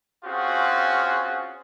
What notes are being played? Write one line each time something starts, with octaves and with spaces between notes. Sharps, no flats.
C4 C#4 F4 F#4 G#4